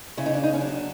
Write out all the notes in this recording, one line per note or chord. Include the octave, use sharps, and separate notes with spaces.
C#3 E4
D#4
D4
D#4
C#4
F#3 D4